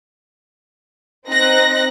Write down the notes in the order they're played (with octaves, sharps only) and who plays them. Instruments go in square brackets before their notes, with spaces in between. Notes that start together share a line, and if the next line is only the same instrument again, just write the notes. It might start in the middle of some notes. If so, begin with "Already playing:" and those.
[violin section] C4 D#4 F#6 A#6